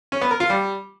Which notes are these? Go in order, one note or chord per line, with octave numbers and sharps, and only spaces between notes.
C#4
B3
A#4
F4
G3